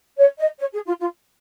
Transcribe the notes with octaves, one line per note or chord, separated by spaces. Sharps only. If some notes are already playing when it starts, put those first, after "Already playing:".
C#5
D#5
C#5
G#4
F4
F4